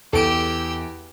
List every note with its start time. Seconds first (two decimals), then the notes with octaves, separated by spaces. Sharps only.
0.13 E2 G4 A4 E6 D7